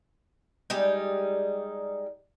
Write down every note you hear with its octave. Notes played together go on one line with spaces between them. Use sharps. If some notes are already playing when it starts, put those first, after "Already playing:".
G3 G#3 D#4